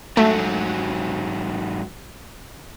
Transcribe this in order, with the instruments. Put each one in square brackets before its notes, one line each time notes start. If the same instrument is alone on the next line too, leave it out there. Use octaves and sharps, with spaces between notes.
[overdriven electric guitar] G#2 F#3 [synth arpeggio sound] A3